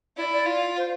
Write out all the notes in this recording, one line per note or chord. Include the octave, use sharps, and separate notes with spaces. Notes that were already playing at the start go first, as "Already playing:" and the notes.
E4 D5
D5
F4
C5